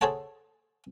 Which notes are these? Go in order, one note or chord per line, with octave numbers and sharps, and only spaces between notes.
G#4 A4 C5 C#5 F#5 A5